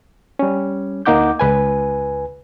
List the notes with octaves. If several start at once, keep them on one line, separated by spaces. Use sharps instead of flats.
G3 C#4
D2 A#3 D#4 F#5 D6 G6
C#2 B4 G#5